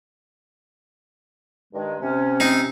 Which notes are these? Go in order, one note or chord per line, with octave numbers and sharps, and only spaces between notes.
G2 D#3 G#3
C3 C#4
C4 D#4